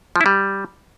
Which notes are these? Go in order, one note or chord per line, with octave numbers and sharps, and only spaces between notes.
F3
E4
G3